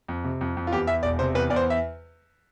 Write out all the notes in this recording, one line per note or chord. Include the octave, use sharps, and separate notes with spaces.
F2
C3
F2
F2
F4
E2 G4
E2 E5
E1 D5
C3 C5
E2 B4
E2 D5
C5
E5